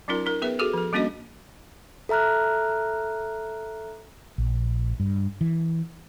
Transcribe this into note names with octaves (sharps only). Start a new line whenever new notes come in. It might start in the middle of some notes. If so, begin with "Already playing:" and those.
F#3 C#4 D#4 F4 A#4
D#4 A#4
B3 G#4 B4 E5
F#4 G#4 A4
F3 A4
G3 A#3 C#4 D4 F#4 D#5
A4 E5 A#5 F6 F#6
A#1
G2
E3